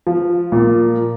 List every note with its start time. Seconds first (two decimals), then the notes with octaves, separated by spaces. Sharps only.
0.07 F3
0.52 A#2